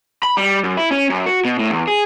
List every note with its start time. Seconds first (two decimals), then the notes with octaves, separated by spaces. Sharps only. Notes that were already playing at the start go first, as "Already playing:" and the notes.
0.24 B5
0.37 G3
0.64 F#2
0.77 E4
0.91 C#4
1.10 F#2
1.26 F#4
1.45 B2
1.59 A2
1.70 E2
1.87 G#4